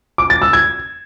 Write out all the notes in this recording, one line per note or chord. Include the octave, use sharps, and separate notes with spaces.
D6
A6
E6
G#6